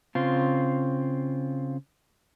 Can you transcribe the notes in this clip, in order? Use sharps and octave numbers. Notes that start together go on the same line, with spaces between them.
C#3 C4 F4